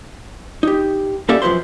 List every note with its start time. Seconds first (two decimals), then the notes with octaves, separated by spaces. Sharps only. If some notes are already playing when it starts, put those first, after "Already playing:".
0.63 D#4 G4
1.29 A#3 C#4 G4 A4 D5 E5
1.42 F#2 F3 A4 B4 C5 C6